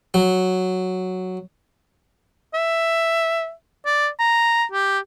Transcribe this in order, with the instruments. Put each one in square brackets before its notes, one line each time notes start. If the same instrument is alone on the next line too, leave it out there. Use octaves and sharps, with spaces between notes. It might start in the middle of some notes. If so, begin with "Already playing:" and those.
[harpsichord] F#3
[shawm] E5
D5
A#5
G4